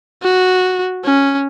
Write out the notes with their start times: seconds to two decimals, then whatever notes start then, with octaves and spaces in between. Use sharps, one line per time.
0.22 F#4
1.04 C#4